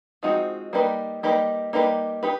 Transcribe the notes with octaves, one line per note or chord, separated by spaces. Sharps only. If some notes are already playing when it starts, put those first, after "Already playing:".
F3 G#3 C4 D#4 F#4
G3 A#3 D#4 G4 B4
G3 A#3 D#4 G4 B4
G3 A#3 D#4 G4 B4
D#4 G4 B4